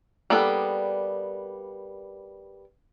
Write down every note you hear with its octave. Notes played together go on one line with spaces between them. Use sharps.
G3 A#3 B3 D4 A4